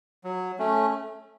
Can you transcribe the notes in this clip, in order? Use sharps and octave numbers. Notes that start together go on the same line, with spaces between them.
F#3
A3 C#4